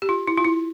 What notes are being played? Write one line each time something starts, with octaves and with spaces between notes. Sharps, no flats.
G4
F4
E4
F4
E4